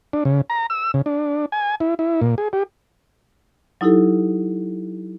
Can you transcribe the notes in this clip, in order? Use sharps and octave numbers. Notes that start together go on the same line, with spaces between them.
D4
C#3
A#5
E6
C#3
D4
G#5
E4
E4
A#2
G#4
G4
F#3 D#4 E4 G4 A4